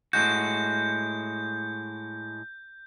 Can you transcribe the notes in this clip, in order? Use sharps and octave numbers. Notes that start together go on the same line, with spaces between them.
A2 G#3 F#4 G6